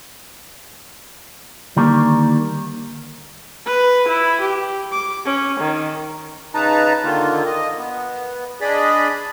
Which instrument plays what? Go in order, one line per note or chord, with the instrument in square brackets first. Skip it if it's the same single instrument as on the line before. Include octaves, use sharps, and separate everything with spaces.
[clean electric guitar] D3 D#3 G3 A#3
[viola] B4
E4
G4
D6
C#4
D#3
[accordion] C#3 D#4 B4 A5 A#5
D3 D#3 A#3 F4
D#5
B3
D4 G#4 D5 D#5 B5